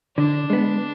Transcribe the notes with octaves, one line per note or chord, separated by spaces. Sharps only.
D3 D4
G#3 B3